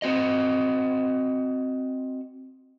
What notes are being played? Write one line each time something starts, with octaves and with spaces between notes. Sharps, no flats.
C4 F#4 D#5